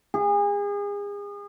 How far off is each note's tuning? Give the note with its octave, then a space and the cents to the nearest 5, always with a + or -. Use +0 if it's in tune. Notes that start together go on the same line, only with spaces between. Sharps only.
G#4 -35